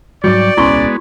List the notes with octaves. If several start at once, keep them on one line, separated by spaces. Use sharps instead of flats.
G#2 F#3 G3 F#4 D5 G5 C#6
D1 B1 G#3 B3 C#4 E4 C6 C#6